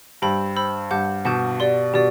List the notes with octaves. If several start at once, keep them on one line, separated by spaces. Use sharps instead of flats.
G2 C5 G5 B5 E6 G6
C5 G5 B5 E6 G6
G2 F#5 A5 D6 G6
B2 F#5 A5 D6 G6
G4 D5 F#5 C6
B2 G4 D5